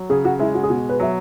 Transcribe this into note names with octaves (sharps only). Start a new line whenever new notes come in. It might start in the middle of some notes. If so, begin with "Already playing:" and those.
Already playing: F#3
C#3 G#4
F#4
G#3 E4
F#4
G#4
B2 F#4
B4
F#3 E5